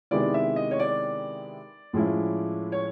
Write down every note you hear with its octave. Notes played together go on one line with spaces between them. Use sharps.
C3 D#3 G#3 B3 E4 D5
E5
D#5
C#5
D5
A2 F3 G#3 C#4 E4
C#5